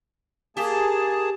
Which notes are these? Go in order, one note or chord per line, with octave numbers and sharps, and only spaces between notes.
A#3 G4 G#4 A5